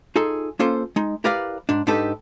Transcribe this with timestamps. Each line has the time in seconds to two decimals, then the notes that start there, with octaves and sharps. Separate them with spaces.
0.16 D#4 F4 G#4 A4
0.59 A#3 C#4 F4 A4 C5
0.96 G#3 D#4
1.24 E4 G4 A#4 B4 D5 F5
1.69 G#2 D4
1.87 G#2 D4 D#4 G4 A4 B4